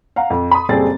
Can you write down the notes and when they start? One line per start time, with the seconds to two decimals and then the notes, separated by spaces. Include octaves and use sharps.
0.16 F5 F#5 A#5
0.30 F2
0.51 B5 C6 D#6
0.69 F#1 G3 C4 G#4 A4 A6